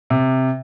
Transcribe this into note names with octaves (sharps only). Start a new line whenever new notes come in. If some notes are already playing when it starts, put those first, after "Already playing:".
C3